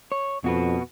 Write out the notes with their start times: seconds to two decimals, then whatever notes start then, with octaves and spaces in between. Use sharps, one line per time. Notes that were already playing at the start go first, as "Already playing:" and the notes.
0.12 C#5
0.44 F2 B2 F#4 B4